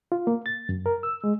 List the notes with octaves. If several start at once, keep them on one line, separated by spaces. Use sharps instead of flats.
F4
A#3
A6
F#2
A#4
E6
G#3